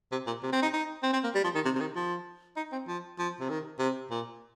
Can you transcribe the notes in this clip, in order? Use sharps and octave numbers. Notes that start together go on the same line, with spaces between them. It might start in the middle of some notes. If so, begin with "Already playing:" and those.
C3
A#2
C3
C4
D#4
D#4
C4
C4
A#3
G3
F3
D#3
C3
C3
D#3
F3
D#4
C4
F3
F3
C3
D#3
C3
A#2